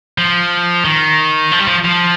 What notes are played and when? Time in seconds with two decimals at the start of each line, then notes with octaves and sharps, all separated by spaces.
0.18 F3
0.85 D#3
1.52 F3
1.59 G3
1.67 F3
1.84 F3